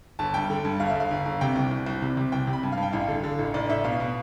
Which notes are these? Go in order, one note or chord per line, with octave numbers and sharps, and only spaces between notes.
G1 A5
G2 G5
D3
G2
G1 F5
E5
G1
F5
G1
G1
C3 G5
C2
C2
C2
C3
C3
C2 G5
C3
B5
G2
F5
G2
G5
A1 F5
D3
D3
A1
A1 D5
A1 E5
B2 F5
B2